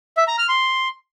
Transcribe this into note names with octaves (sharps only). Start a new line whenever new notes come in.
E5
A#5
F6
C6